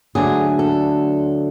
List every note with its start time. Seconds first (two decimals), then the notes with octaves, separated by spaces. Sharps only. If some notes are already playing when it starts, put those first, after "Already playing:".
0.15 D2 D3 F#3 G#4
0.59 A4